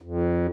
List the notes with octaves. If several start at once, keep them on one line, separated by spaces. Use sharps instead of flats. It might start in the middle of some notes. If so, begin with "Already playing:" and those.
F2